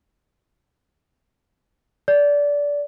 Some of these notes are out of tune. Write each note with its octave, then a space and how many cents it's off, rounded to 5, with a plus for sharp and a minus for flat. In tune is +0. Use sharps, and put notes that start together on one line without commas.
D5 -20